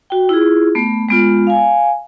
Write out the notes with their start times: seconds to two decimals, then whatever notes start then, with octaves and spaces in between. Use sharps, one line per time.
0.10 F#4 G5
0.29 E4 F4 G#4
0.75 A3 B3
1.09 G#3 B3 F4
1.47 F5 G#5